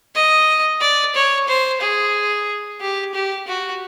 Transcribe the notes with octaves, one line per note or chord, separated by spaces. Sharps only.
D#5
D5
C#5
C5
G#4
G4
G4
F#4